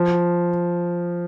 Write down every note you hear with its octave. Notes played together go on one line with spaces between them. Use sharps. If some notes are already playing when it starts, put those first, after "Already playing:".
Already playing: F3